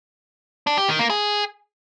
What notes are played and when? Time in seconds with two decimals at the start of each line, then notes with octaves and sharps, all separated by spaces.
0.67 D4
0.78 G4
0.88 D#3
0.99 A#3
1.10 G#4